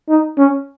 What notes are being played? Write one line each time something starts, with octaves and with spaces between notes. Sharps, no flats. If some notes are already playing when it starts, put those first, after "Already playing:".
D#4
C#4